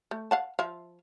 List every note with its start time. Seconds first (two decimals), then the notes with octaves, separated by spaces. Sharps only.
0.11 A3
0.31 F5 F#5 A5
0.59 F3 E5 F5